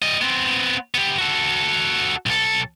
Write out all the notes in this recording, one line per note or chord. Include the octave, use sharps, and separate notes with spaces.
G3 D#5
B3 C4
B3 G4
F#4 A4
B1 A4